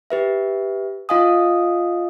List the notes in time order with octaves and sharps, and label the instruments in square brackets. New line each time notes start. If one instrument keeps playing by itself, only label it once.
[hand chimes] G4 B4 E5
F4 D#5 F5 G#5 D#6